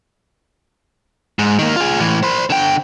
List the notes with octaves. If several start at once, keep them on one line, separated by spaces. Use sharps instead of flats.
G#2
D#3 A#3
F4 G#4
A2 E3
C5 B5
D3 G5